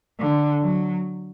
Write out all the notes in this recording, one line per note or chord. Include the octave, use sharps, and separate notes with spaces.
D3
F#3